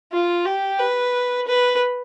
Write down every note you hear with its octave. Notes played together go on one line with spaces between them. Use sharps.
F4
G4
B4
B4